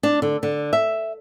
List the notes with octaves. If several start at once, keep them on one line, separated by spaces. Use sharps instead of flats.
D4
D3
D3
E5